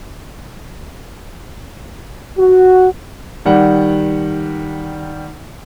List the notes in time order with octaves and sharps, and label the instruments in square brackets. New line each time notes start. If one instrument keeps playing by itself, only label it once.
[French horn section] F#4
[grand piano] D#3 G3 F#5